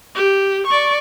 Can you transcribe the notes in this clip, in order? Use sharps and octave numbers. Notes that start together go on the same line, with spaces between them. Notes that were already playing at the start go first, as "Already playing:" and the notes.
G4
D5 C#6